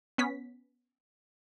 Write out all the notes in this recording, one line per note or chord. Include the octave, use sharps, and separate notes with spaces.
B3 C#4 B6